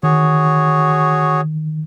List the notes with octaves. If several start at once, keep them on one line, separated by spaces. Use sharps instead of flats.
D#3 F#4 G#4 C#5